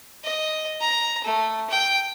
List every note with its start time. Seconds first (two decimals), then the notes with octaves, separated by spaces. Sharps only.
0.24 D#5
0.81 A#5
1.24 A3
1.70 G5